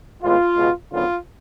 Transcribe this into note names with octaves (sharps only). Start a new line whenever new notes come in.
A2 E3 G#3 B3 F4
C#2 B2 G#3
G#1 F#2 D3 F#3 B3 F4